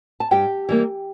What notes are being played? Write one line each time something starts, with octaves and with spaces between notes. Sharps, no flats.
A5
G2 G4 G5
E3 G3 A#3